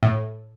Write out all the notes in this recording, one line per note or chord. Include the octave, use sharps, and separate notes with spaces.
A2